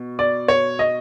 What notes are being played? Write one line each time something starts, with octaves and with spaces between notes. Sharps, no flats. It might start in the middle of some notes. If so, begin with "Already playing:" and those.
Already playing: B2
D5
C#5
D#5